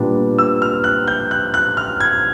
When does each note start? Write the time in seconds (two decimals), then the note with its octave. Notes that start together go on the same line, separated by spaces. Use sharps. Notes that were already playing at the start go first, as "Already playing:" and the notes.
Already playing: A#2 G3 B3 D4
0.39 E6
0.62 F6
0.84 F#6
1.08 G6
1.31 F#6
1.54 F#6
1.77 F6
2.00 G#6